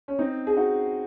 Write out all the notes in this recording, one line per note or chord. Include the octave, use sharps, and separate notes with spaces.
C#4
C4 D#4
G#4
D#4 F#4